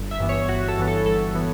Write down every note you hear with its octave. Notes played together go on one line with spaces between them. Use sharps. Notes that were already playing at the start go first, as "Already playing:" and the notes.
Already playing: G1
E5
G2 E3 B3
C#5
G1 F#4
A4
G2 E3 B3
A4
G1 A4
E3 B3